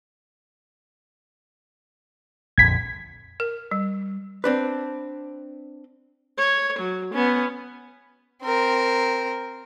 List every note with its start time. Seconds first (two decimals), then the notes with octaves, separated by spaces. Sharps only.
2.58 A#1 F2 D3 G#6 B6
3.40 A#4
3.71 G3
4.44 C4 D4 B4
6.38 C#5
6.80 F#3
7.13 B3 C#4
8.43 C4 A#4